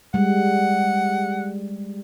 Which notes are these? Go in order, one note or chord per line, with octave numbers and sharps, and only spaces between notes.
G3 G#3 F#5